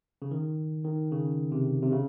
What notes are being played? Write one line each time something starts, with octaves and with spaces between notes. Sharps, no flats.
C#3
D#3
D#3
C#3
C3
C3
C#3